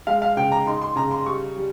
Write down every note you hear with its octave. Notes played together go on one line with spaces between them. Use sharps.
G#3 F5
F5
C#3 G5
A#5
D#4 C6
C6
C#3 A#5
C6
G3 C#6
G3